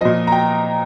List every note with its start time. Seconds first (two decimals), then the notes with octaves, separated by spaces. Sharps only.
0.01 A#2 F3 D#5
0.27 A#5
0.32 G5